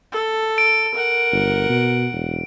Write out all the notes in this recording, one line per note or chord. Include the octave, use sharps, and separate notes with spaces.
A4
D7
A#4 F#5
G1
B2
E1